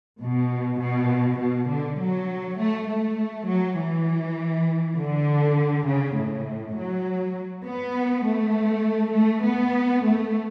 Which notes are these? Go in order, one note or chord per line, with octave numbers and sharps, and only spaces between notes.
B2
B2
B2
D3
F#3
A3
A3
F#3
E3
D3
C#3
A2
F#3
B3
A3
A3
B3
A3